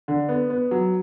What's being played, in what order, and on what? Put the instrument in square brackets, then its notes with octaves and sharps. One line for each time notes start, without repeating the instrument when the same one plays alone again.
[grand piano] D3
B3
B3
F#3